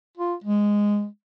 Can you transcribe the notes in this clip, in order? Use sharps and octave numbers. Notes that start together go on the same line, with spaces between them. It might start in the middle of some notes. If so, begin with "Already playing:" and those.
F4
G#3